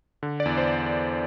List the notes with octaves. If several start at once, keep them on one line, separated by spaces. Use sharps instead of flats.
D3
D5
E2
C5